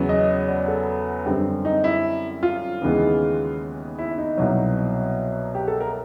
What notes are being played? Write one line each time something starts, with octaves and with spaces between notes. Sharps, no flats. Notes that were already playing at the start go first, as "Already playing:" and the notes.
Already playing: E2 C#3 F#3 B3
D#5
D5
A4
F#2 D3 G3 C4
D#4
E4
F4
D#2 C#3 E3 G#3 B3
E4
D#4
C2 B2 F#3
G4
A4
A#4